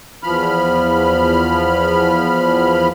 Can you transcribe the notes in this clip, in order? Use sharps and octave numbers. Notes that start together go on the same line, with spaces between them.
E2 F3 B5 F6